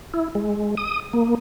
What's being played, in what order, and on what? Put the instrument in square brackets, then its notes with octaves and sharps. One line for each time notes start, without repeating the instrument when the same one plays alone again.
[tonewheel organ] E4
G#3
D#6
A#3